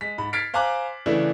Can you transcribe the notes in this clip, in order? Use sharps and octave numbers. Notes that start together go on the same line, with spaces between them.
G#3 B6
G#2 B5
F6 G#6 A6 B6 C7 D7
C5 F5 G#5 A#5 D6 F#6
C#3 E3 A3 D4 E4